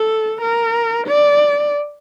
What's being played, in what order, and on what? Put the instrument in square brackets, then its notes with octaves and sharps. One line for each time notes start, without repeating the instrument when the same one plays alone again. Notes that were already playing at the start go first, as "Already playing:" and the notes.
Already playing: [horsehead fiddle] A4
A#4
D5